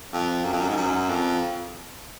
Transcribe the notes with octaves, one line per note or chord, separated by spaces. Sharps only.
F2
F#2
F2
F#2
G#2
F#2
F2